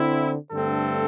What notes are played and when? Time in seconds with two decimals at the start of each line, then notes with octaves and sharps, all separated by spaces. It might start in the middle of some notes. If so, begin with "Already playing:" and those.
Already playing: D3 C4 E4
0.51 G2 D3 A3 C4 A4